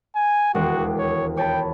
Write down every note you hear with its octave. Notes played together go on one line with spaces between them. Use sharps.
G#5
E1 D#2 D4 F#4
C#5
C#5 G5 A5 B5